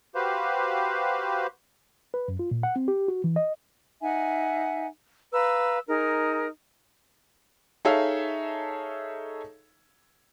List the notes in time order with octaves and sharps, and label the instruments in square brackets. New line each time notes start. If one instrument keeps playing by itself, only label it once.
[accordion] F#4 G4 B4 C5 F5
[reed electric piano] B4
F#2
F4
A#2
F#5
C4
G4
F#4
E3
D#5
[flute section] D#4 E5 F#5 G#5
B4 F5 A#5 E6
D#4 G#4 A#4
[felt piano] D#4 G#4 A4 C#5 E5 F5